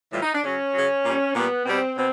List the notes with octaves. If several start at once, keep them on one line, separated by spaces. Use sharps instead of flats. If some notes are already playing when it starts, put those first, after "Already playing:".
A2 E3 G3 F4
D#4
D4
C#3 F#3 C#4
C#3 F#3
A#2 G3
A#2 G3 B3
B2 G3 C4
B2 C4